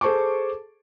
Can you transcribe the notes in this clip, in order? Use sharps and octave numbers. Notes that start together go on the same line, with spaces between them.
G#4 A4 C5 A5 C#6 D6